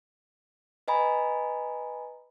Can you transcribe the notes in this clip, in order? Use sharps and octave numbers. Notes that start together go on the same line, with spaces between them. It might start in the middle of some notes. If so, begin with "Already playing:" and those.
B4 D#5 G#5 A#5 B5